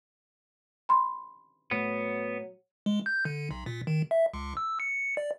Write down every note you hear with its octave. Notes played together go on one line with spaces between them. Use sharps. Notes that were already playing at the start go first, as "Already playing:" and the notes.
B5 C6
A2 F#3 B3
G#3
G6
D3
B1
A#2
D#3
E5
C#2
E6
C#7
D5